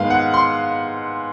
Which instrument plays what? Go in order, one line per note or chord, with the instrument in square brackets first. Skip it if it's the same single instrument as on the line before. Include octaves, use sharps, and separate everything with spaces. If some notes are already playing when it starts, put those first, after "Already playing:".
Already playing: [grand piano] G#2 D#3 G#3 B3 F5
F#5
C6